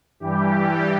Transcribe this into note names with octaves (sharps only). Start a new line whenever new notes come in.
G2 E3 G3 G4